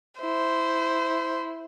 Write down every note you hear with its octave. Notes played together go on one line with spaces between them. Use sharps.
E4 C5